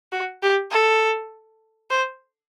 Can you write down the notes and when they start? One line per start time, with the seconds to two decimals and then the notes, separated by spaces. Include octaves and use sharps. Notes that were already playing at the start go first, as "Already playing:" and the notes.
0.12 F#4
0.43 G4
0.72 A4
1.90 C5